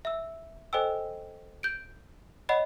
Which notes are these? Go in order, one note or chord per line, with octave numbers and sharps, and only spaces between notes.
E5 E6
A4 C5 D#5 G5 G#5 E6
G6 D7
C#5 D#5 F#5 B5